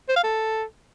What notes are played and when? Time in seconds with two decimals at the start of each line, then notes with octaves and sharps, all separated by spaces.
0.09 C5
0.16 F5
0.24 A4